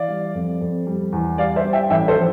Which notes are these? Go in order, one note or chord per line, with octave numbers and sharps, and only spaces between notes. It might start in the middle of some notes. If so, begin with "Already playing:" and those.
Already playing: E3 D5 F5
G3
F2
F2
G3
E2
G3 D5 F5
C5 E5
G3
E5 G5
A1 E5 G5
A4 C5
F3